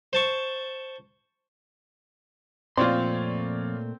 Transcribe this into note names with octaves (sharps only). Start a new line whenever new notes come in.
C5 A5 C#6
F2 A#2 A3 C4 F4 C#5 D5 C6